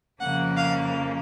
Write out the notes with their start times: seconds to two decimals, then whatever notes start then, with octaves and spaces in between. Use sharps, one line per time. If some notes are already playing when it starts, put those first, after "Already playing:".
0.20 F2 C#3 F3 A#3 F#5
0.56 F5